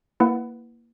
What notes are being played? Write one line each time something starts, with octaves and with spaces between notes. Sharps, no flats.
A#3 E4 B4 F#5